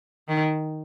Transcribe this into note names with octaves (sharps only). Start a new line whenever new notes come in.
D#3